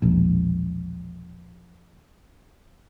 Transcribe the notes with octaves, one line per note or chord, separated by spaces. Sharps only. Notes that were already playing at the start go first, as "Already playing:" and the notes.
E1 A#1